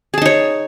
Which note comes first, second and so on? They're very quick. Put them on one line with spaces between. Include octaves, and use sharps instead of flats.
G#4 A5 D#4 C#5